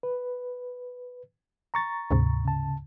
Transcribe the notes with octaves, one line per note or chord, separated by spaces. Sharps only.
B4
A#5 C#6 A6
D2 G#2 C3
C#3 A5